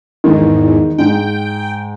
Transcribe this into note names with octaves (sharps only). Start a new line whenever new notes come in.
E2 G#2 D#3
G#2 G5